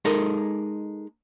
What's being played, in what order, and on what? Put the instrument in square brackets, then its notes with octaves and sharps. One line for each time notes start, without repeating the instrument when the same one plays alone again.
[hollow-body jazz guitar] G#3 D#4 A4 A#4